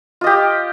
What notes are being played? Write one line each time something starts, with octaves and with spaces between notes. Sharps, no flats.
F4 G4 D#5